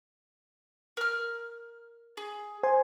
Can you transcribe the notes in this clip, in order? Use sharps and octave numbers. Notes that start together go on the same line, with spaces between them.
A#4 F6
G#4
C5 G#5 C6